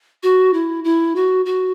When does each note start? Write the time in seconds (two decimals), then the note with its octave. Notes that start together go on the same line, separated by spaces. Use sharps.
0.23 F#4
0.53 E4
0.84 E4
1.16 F#4
1.46 F#4